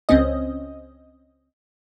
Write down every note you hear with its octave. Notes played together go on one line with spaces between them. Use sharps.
C#2 C4 C#4 D#5